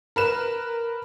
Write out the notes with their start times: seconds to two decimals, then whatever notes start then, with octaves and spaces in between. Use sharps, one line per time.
0.16 A#4 B4 E7